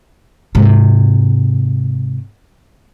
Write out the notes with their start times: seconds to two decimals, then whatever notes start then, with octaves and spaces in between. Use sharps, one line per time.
0.55 G#2 C3